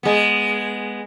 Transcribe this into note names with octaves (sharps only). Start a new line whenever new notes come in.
G#3 B3